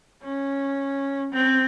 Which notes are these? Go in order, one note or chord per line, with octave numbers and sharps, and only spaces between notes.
C#4
C4